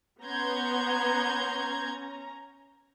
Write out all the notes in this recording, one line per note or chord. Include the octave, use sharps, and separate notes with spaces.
B3 C#4 A#5 C6 G6 G#6